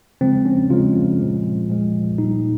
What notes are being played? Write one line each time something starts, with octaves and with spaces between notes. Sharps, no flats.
C#3 F3 G#3 C4
C#4
C#3 F3 G#3 F4
A#2 F3 G#3
A#2 F3 G#3
A#2 G3 D#4